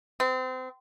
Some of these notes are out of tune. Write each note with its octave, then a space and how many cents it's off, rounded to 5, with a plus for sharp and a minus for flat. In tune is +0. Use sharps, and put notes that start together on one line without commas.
C4 -30